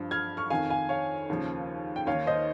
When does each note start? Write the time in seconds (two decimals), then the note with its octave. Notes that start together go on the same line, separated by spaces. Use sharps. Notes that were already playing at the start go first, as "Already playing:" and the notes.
Already playing: G2 F3
0.11 F6 G#6
0.37 C#6 F6
0.50 F2 D#3 F5 G#5
0.70 F5 G#5
0.89 C#5 F5
1.29 D#2 C#3 F3
1.96 G5
2.07 D#2 D#3 C#5 F5
2.27 C5 D#5